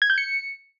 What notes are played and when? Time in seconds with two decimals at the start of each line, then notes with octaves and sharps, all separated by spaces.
0.02 G#6
0.10 G6
0.18 C#7